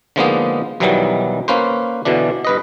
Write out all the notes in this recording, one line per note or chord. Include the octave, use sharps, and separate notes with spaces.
D3 F3 G#3 A#3 B3 D#4
B1 B2 D#3 E3 F#3 G3
A#3 C#4 B4 C5
B2 D3 E3 D4
G2 B4 D#5